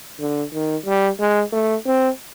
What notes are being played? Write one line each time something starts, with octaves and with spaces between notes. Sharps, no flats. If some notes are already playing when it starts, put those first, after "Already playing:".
D3
D#3
G3
G#3
A3
C4